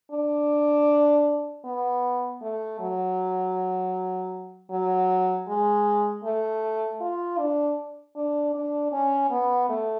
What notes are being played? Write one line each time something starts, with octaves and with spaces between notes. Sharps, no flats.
D4
B3
A3
F#3
F#3
G#3
A3
F4
D4
D4
D4
C#4
B3
A3